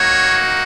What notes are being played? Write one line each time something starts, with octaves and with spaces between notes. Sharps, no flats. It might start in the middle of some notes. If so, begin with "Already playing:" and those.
Already playing: A#3 D#4 F#4 C#5